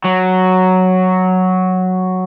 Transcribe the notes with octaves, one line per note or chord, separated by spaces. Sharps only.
F#3